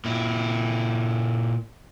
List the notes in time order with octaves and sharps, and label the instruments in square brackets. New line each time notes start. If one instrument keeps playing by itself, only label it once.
[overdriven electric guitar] A#2 E4